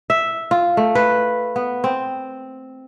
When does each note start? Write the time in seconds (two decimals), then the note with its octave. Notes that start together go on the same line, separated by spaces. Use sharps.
0.10 E5
0.51 F4
0.77 A3
0.95 B4
1.56 B3
1.84 C4